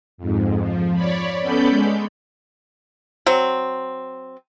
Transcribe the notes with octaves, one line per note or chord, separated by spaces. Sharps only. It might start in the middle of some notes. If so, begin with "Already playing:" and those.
F2 G#2
F3
C#5 D5 B5
B3 C#4 A4 D5 B5 G6
G#3
F#3 C4